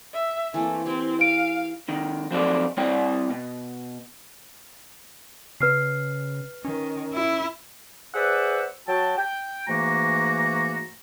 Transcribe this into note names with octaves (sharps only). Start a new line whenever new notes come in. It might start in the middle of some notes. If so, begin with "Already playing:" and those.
E5
E3 A3 A#3 C4
C4 E4 G4
F5 D7
C3 D#3
F3 F#3 C4 D#4 A4 D5
G3 C4 E4 C#5 D5 G5
B2
C#3 B4 F6 C7
D#3 C#4
E4
G#4 B4 C5 D5 E5 F#5
F#3 F#4 G5 A5
G5
G#2 E3 A3 A#3 F#4 A#5